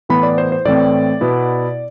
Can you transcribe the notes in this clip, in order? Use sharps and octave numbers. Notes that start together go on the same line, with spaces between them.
A2 E3 B3 B5
D5
C5
C5
A2 E3 A3 C4 D5
B2 B3 E4